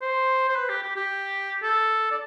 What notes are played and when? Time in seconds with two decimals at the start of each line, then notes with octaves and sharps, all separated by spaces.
0.02 C5
0.49 C5
0.56 B4
0.69 G4
0.83 G4
0.96 G4
1.63 A4
2.11 D5